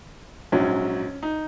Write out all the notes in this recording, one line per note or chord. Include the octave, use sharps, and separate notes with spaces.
A#1 G#2 F#3 C#4
D#4